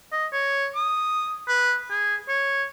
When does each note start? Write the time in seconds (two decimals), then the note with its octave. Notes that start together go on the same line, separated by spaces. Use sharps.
0.12 D#5
0.33 C#5
0.75 D#6
1.48 B4
1.91 G#4
2.29 C#5